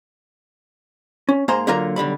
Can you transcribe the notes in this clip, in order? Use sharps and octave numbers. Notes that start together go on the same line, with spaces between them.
C#4
G#2 A#3 G#4 C5 A#5 C6
D3 F#3 A#3 F4 A#4 A#5
B1 D3 G3 B5